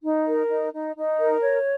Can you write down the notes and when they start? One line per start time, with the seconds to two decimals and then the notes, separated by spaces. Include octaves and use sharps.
0.04 D#4
0.27 A#4
0.50 D#4
0.74 D#4
0.97 D#4
1.19 A#4
1.42 C#5